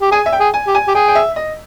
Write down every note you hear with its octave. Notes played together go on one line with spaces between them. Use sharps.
G4
G#4 G#5
E5
G5
G#4
G#5
G4
G#5
G4
G#4 G5
G5
E5
D#5